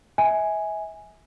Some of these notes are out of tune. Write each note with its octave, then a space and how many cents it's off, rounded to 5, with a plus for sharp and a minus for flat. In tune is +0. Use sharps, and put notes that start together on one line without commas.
E5 -35 G#5 +0